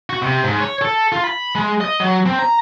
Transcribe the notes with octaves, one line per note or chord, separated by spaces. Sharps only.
F#4
C3
G#2
C#5
A4
F4
B5
G#3
D#5
F#3
C4
A#5